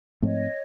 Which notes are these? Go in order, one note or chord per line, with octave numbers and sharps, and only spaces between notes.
G#2 F3 A3 C4 C#5 D#5